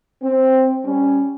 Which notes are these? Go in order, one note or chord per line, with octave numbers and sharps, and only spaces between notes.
C4
G3 C#4